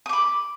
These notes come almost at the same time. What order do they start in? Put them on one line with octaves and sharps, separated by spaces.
D#6 D6 B5